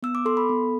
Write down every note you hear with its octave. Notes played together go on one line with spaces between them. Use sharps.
B3 E6
D6
A4 C6
B5
B3